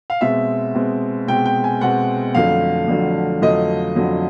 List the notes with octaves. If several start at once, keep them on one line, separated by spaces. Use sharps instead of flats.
F5
B2 G#3 C4 E5
B2 G#3 C4
B2 G#3 C4 G5
G5
G#5
B2 G#3 C4 F#5
F2 D3 F#3 A3 F5
F2 D3 F#3 A3
F2 D3 F#3 A3 D#5
F2 D3 F#3 A3